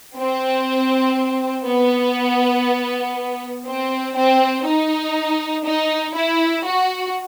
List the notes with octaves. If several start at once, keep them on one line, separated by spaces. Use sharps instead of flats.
C4
B3
C4
C4
D#4
D#4
E4
F#4